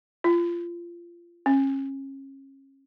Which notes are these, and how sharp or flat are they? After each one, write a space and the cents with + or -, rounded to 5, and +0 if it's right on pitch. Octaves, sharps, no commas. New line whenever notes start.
F4 -20
C#4 -30